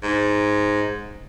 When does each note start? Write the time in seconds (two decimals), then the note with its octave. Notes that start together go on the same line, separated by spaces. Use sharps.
0.03 G#2